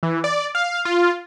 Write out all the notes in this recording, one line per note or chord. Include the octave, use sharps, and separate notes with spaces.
E3
D5
F5
F4